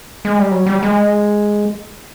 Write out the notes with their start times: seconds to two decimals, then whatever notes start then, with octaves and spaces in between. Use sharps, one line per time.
0.25 G#3
0.39 G3
0.51 F#3
0.66 G3
0.83 G#3